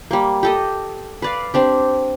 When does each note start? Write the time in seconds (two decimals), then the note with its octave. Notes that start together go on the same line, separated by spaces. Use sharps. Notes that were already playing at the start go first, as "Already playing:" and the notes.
0.11 G3 A#3
0.43 G4 A4 D#5
1.22 B4 D5 F5
1.54 C4 D4 G4